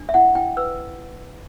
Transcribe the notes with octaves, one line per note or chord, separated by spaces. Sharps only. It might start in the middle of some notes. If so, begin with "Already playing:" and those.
Already playing: D4
E5
E4 F#5
E4 G5
B4 E6